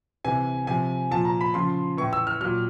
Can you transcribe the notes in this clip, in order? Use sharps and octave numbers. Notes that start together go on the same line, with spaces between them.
C3 E3 G#5
C3 F3 G#5
A#2 F3 A5
A#5
B5
C#3 F3 C6
A2 E3 C#6
E6
F6
A#2 F#3 F6